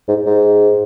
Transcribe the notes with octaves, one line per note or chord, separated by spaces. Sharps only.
G#2
G#2